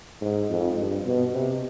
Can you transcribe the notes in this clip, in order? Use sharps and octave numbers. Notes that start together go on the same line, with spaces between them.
G#2
F2
G2
B2
C3